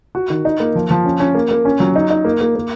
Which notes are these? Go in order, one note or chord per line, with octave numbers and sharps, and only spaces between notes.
F#4
D#3
D#4
A#3
F3
F3
C#4
C#4
A#3
A#3
C#4
F#3
D#4
D#4
A#3
A#3
A#3